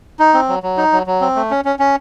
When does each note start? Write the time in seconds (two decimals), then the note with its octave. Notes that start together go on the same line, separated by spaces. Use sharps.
0.19 D#4
0.34 C4
0.49 F#3
0.63 F#3
0.78 D#4
0.92 F#3
1.07 F#3
1.21 C4
1.36 A3
1.51 C#4
1.65 C#4
1.79 C#4